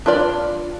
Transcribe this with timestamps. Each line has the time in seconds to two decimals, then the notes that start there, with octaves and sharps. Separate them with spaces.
0.06 D4 F4 B4 D5